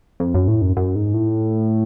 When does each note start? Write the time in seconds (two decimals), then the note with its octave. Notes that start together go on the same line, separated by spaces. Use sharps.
0.20 F2
0.34 F#2
0.48 A2
0.62 F#2
0.77 F#2
0.95 G#2
1.14 A2